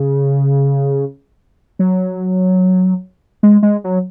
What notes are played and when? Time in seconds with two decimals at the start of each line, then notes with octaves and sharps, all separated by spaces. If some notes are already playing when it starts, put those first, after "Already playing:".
Already playing: C#3
1.79 F#3
3.43 G#3
3.63 G#3
3.84 F#3